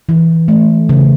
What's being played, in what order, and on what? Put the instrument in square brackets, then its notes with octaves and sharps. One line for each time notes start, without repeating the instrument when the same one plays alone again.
[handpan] E3
A3
C#3